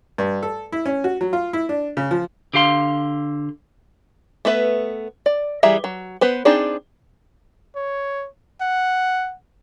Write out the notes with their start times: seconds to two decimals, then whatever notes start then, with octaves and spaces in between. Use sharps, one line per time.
0.18 G2
0.43 A4
0.72 E4
0.86 C#4
1.04 F#4
1.21 F#3
1.33 F4
1.53 E4
1.69 D4
1.97 C#3
2.11 F3
2.54 D3 G4 F5 C6
4.45 A3 B3 B4 E5
5.26 D5
5.63 E3 G3 G#4 E5 A#5
5.84 F#3
6.21 B3 B4 C5
6.45 C4 D4 D#4 G#4 D5
7.75 C#5
8.61 F#5